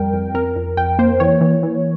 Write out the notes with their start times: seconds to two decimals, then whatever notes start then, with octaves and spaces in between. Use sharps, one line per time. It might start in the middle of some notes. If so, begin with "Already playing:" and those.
Already playing: F2 G3 A#4 G5
0.14 F2
0.34 F2 A#4
0.56 F2
0.77 F2 G5
0.99 A#3 C5
1.20 E3 C#5
1.41 E3
1.63 E3